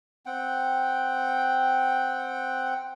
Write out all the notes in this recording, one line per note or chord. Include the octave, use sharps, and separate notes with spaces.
C4 F#5 G5